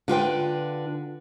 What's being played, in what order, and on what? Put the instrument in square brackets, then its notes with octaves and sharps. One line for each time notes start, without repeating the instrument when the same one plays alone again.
[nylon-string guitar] D3 F4 B4 G5